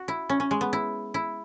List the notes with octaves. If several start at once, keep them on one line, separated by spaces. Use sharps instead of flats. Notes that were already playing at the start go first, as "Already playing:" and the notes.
Already playing: F#4
E4
C#4
C#4
G#3
B3
E4
E4